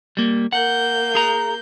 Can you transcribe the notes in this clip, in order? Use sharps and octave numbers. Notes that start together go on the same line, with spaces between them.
G3 A#3
A#3 F#5 G6
G#4 A#5